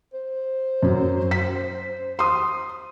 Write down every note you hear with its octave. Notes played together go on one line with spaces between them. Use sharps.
C5
F#2 F#3
B6
C6 D#6